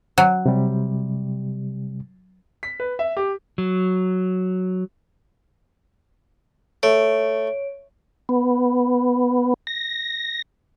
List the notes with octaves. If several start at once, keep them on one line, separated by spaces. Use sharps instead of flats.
F#3
C3 G3
B6
B4
E5
G4
F#3
A3 C#5 D7
B3
A#6